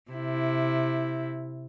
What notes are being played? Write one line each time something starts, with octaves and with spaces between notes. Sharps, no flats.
C3 E4